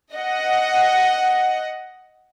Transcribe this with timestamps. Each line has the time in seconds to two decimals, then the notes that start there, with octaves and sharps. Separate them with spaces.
0.14 D#5 F#5